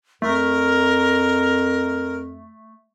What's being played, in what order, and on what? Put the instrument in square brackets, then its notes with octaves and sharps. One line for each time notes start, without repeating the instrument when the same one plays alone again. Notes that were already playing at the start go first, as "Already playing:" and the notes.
[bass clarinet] F2 [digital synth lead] A3 [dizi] A#4